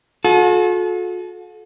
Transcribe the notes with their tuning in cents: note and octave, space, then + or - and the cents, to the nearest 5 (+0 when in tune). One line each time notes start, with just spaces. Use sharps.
F#4 -45 A4 -35